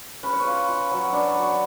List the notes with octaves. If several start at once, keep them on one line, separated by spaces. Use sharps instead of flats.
C#4 B4
C#5
F4 B4
F4
F#3
D4 B4
C#5
F#3
C#5